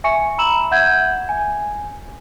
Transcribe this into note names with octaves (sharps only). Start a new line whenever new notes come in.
E5 G#5 C#6 C#7
A#5 B5 E6 E7 F#7
E5 F#5 G6 G#6
G#5